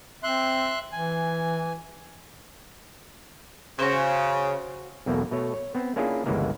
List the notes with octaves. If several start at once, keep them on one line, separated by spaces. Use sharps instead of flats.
C4 E5 C6 F#6
E3 G#5
C#3 F#4 C5
B1 E2 B2 A3 A#3
B2 A3 C#5
C#5
B3 C4
A#3 C#4 D4 E4 F4 G#4
G1 C#2 E3 G#3 A#3